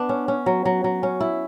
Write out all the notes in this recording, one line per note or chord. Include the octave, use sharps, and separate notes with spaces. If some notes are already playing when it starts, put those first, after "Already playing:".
Already playing: B3 D4
C#4
C#4
F#3
F#3
F#3
C#4
E4